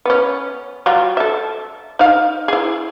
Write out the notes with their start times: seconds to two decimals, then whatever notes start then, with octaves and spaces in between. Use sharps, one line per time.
0.05 B3 C#4
0.86 F#3 G3 F4
1.17 A4 E5
1.99 D#4 F5
2.48 E4 G#4